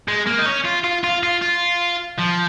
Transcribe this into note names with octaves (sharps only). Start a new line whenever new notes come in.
G#3
A#3
D#4
C#4
F4
F4
F4
F4
F4
F3